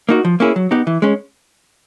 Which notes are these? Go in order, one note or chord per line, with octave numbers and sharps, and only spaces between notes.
A#3 D#4 F#4
F3
A#3 C#4 E4 G#4
F#3
B3 D#4 G4
E3
G#3 C#4